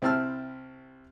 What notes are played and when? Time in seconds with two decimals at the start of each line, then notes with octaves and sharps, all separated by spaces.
0.02 C2 C4 E4 A5 E6 F6